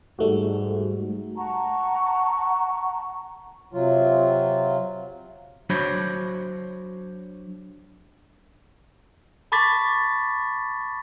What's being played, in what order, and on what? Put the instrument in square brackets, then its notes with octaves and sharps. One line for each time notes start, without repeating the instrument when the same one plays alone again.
[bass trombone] G#2 [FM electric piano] G3 A3 F#4
[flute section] F#5 A5 A#5 C#6
[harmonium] C3 F#3 F4
[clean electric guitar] F#3 D4 F#4 C5 C#5 B5
[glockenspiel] A5 B5 C#6 D6 A6 B6